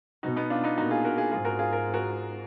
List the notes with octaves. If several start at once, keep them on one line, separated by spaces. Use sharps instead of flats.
B2 D#4 F#4
B3 D#4
D4 F4
B3 D#4
A#2 D#4 F#4
F4 G#4
F#4 A#4
F4 G#4
G#2 F4 G#4
F#4 A#4
F4 G#4
A#4
F#4 A#4